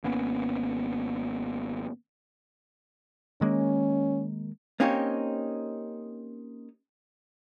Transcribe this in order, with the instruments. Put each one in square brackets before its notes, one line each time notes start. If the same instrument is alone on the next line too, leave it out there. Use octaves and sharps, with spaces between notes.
[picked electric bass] G#1 A#3 B3 C#4
[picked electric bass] D#3 G#3 A#3 [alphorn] C#4
[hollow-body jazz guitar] A#3 C4 C#4 D#4 G4 C#5